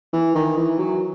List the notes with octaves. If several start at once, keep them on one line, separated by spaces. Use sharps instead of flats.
E3
D#3
E3
F#3